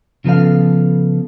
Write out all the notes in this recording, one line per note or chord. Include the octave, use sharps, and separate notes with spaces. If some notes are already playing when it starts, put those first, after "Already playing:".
C#3 F3 B3 A4 F5